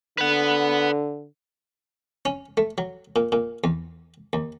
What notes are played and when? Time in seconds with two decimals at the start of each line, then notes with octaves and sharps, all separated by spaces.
0.18 D3 B4 F#5
2.25 C#4
2.57 A3
2.78 F#3
3.16 A#2
3.32 A#2
3.64 E2
4.33 D#2